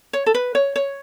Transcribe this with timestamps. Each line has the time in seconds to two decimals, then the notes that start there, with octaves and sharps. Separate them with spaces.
0.13 C#5
0.26 A4
0.34 B4
0.55 C#5
0.76 C#5